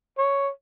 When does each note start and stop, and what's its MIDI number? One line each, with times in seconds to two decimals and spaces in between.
0.18 0.49 73